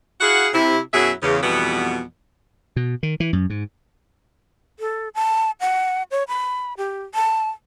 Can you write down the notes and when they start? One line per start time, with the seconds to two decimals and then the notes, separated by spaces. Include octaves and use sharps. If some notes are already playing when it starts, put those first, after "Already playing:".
0.21 E4 F#4 G#4 F5 F#5
0.54 C3 E4
0.94 F#2 B2 F#3 E4 G#4 E5
1.22 E2 C#3
1.42 F2 B2 E3 G3 B3
2.76 B2
3.03 D#3
3.20 E3
3.33 F#2
3.50 G#2
4.79 A4
5.15 A5
5.60 F#5
6.11 C#5
6.28 B5
6.77 G4
7.15 A5